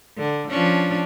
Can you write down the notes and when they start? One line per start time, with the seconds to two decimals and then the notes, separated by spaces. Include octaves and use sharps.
0.17 D3
0.50 F3 C#4 D4